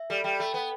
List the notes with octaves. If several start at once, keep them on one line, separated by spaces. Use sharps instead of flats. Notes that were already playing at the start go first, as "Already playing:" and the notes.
Already playing: E5
G3 A4
G3 G5
A3 A4
B3 G5